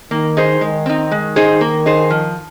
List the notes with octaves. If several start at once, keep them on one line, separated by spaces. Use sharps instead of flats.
D#3 A#3
D#4 G#4 C5
D#3 G#3
C4 D#4
G#3
D#4 G#4 C5
A#3
D#4 G#4 C5
F3